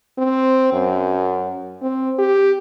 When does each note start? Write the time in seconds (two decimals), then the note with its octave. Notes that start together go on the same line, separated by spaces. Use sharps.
0.18 C4
0.73 F#2
1.82 C4
2.19 G4